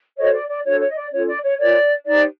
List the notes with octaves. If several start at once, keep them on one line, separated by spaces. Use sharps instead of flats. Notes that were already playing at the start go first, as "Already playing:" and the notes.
F#4 A4 C5 C#5 D#5
D5
D5
D4 F#4 A4 C5 C#5
C#5
D#5
D5
C#4 F4 A4 C#5
D5
C#5
F4 A#4 C#5 D5
D#4 G4 C5 D5